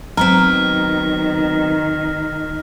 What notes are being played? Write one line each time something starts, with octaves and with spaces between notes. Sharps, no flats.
D#3 F#3 B3 C4 A#5 F6 B6